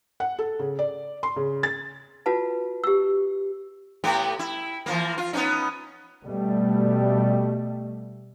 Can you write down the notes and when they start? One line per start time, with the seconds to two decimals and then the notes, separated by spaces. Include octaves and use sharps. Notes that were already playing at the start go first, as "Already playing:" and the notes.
0.20 F#5
0.39 A4
0.59 C#3
0.79 D5
1.23 C6
1.36 C#3
1.63 A6
2.26 F4 F#4 B4 A5
2.84 G4 E6
4.04 A2 B3 G4
4.39 E4
4.86 E3 F3 A#3
5.18 F4
5.33 B3 C#4 D#4
6.23 B2 G3 A3